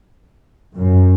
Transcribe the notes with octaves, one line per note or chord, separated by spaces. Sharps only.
F#2